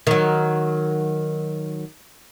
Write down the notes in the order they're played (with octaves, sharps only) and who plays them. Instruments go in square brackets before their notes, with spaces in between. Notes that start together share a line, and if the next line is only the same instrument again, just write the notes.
[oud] D#3 F#3